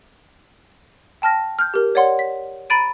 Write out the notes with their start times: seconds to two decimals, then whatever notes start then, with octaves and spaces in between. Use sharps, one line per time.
1.22 G5 A5 F6 A#6
1.59 F6 G6
1.74 G4 A#4
1.95 C#5 D5 F#5 C6
2.19 B6
2.70 A#5 B5 A6 D7 D#7